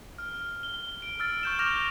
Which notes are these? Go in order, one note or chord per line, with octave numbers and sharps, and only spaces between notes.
F6
G7
D7
E6 F6 A6
C#6 G6 E7
C#6 D6 F6 G6 A#6 F7